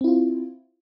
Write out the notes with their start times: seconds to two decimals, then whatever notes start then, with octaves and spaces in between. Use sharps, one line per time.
0.01 C4
0.04 E4
0.08 F4